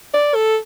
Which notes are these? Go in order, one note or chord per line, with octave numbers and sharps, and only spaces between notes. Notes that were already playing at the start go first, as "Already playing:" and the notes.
D5
A4